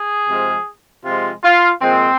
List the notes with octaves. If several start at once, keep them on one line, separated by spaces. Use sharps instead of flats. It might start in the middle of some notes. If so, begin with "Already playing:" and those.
Already playing: G#4
C3 F3 G#3
C3 F3 G#3 F4
F4
A#2 F3 G#3 C4